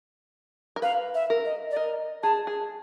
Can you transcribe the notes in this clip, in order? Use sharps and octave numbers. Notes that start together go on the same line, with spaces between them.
A#4
B4 F5
E5
A#4
D#5
D5
A#4 D#5
G#4 A5
G#4